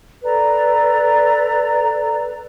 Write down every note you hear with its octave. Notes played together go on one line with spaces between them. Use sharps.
A4 B4 D5 A#5